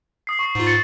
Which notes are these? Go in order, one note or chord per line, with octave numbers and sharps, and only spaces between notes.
D#6 C7
C#6 C7
G#2 F4
A6 C#7